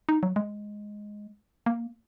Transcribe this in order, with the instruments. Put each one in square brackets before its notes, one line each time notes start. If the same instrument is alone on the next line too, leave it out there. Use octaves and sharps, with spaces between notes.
[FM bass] D#4
F#3
G#3
A#3